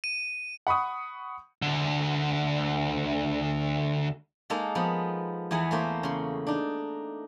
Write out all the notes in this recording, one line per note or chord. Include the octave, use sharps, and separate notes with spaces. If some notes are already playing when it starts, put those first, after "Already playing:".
D#7
F#5 B5 C#6 D#6
D2 D3
G#3 A#3 D#4 A4
F3 B3
E2 E3 B3 G#4 F#5
A3 A#3 C5
C#3 C6
D4 D#4